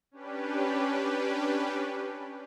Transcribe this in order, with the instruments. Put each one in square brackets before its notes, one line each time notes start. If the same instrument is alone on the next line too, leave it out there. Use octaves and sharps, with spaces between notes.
[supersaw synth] C#4 D4 G4 B4